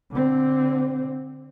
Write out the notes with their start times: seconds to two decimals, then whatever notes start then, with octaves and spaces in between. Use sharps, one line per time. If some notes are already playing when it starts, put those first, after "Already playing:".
0.12 D3 C4